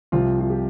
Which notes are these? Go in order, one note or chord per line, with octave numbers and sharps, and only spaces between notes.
C2 C3 F3 F4
F4
G4